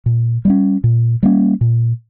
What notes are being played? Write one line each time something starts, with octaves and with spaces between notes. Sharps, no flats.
A#2
G3 A#3 C#4
A#2
G3 A#3 C#4
A#2